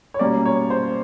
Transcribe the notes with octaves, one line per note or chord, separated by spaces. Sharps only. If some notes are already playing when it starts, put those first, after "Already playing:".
C#5
B2 G3 A#3 C#4 D5
C#5
C5